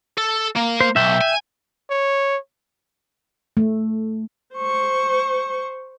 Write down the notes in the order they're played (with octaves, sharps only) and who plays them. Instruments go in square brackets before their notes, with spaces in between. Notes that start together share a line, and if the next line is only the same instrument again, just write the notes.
[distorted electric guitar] A4
A#3
[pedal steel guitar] C5
[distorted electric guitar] B1 [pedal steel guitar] E5 G5
[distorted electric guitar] G#5
[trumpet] C#5
[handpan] A3
[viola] C5 C#6